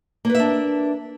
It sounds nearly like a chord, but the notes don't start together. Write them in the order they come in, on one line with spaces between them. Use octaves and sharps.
A#3 B4 E5 D4